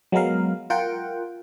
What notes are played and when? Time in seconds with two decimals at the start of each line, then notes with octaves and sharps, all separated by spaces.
0.12 F#3 G#3 B3 A#4 F5
0.70 F4 A#4 F#5 G5